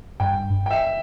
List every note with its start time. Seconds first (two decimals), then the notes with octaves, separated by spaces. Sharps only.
0.20 G2 G5
0.66 G5
0.71 E5